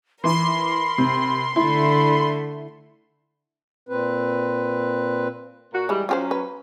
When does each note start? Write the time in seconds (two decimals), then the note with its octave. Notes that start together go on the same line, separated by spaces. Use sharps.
0.24 E3 E4 A#4 B5 C6
0.98 C3
1.56 D3 A3 E4 B5
3.89 A#2 C4 B4
5.73 A#2 F#4
5.89 E3 G3 G#3
6.09 F#3 C#4 F4 G4 C5
6.31 B4